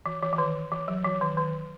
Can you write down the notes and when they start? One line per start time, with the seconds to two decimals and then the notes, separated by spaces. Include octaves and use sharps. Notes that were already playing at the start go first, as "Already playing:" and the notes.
0.06 E3
0.22 E3
0.33 E3
0.38 D#3
0.72 E3
0.88 F#3
1.05 E3
1.21 D#3
1.37 D#3